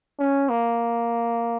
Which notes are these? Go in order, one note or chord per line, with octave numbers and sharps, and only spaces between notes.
C#4
A#3